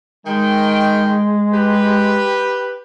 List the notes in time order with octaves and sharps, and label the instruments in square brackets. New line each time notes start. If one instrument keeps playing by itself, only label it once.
[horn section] D#3 G5 [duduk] G#3
[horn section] G4 B4